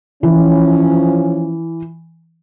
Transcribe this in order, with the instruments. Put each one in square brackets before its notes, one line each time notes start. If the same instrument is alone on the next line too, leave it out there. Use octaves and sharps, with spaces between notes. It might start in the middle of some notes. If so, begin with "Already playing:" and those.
[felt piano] E3 [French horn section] F3 C#4